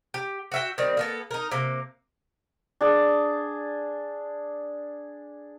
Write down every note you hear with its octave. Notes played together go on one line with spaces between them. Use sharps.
G4
F#4 E5 G5
D#3 G3 C4
A#3 B3 A4
D#4 A#4
C3 A#3
D4 G#4